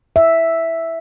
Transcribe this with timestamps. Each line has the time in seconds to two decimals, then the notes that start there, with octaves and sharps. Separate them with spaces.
0.16 E5